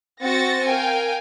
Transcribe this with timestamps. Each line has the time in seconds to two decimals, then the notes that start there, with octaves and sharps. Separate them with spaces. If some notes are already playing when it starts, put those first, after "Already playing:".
0.23 C4 F#4 C5 A6 A#6 C#7
0.66 A#4 F5 G5 G#5